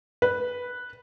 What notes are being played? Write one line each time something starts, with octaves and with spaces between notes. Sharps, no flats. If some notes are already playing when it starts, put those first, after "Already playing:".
B4